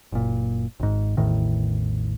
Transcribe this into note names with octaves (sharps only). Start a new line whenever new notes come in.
F#1 A#2
G#1 G#2
A1 E2 A2 D#3